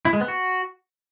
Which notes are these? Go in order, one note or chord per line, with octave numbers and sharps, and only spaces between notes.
E4
G#3
B3
F#4